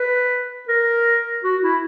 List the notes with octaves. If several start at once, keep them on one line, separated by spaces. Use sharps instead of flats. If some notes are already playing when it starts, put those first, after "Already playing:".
Already playing: B4
A#4
F#4
E4